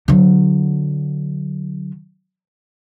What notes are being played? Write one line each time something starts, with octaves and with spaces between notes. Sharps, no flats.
D3 F#3